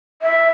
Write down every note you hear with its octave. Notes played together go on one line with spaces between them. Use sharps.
E5